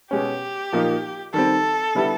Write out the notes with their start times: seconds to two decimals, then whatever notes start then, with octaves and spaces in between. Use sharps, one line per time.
0.11 B2 G#3 C#4 G4
0.72 A#2 F3 A#3 D#4
1.34 D#3 G3 C4 A4
1.95 D3 G3 B3 E4 G4